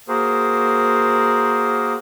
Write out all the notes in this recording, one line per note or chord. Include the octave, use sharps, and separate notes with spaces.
A#3 F#4 G#4 A#4 C5